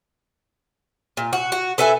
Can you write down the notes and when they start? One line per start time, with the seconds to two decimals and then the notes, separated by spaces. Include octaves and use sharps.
1.17 A#2
1.33 F#4
1.52 F#4
1.78 A4 B4 E5 G#5